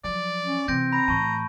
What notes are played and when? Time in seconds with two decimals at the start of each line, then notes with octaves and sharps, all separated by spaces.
0.04 F3 F#3 D5
0.45 C#4
0.68 C3 E3 C4 G6 A#6 D7
0.92 A#5 B5
1.08 A2 E3 A5 C#6